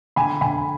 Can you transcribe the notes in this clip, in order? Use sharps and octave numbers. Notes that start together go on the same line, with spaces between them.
D3 G#5 B5
D3 G#5 B5